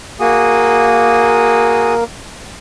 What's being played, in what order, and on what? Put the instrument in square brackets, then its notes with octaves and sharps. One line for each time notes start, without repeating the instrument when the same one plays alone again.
[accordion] A#3 [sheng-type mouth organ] F#4 G#4 D#6